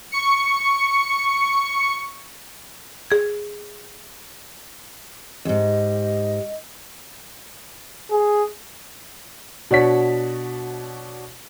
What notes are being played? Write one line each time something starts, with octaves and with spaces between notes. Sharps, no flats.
C#6 C#7
G#4 G#6
F2 G#2 G4 D#5
G#4
B2 D4 F#4 C#5 D5 B6